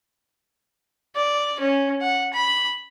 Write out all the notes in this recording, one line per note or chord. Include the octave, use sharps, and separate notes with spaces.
D5
C#4
F#5
B5